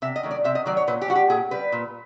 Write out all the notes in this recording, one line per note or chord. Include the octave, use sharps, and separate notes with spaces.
C3 E5
D#5
D#3 F#3 A3
D5
C3 E5
D#5
D#3 F#3 A3 D5
C#5
A#2 B4
G4
G3 F#4
G4
A#2 G#4
G3 B4
A#2